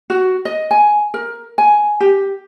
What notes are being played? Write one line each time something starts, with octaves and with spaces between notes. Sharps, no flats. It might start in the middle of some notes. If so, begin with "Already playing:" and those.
F#4
D#5
G#5
A#4
G#5
G4